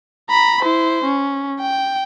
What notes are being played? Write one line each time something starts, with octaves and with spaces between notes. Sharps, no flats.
A#5 B5
E4 C5
C#4
G5